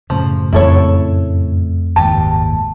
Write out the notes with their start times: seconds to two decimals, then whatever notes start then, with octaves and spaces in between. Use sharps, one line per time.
0.10 F#2 A2 C#3 F3
0.53 F2 A3 E4 A4 C#5
1.96 F#1 D#2 G#2 G4 A5